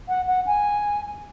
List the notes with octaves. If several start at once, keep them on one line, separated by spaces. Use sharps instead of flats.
F#5
F#5
G#5